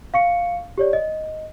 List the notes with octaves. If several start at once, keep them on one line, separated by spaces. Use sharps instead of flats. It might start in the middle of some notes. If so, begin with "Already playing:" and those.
F5 C#6 C#7
G4 C#5 D5
D#5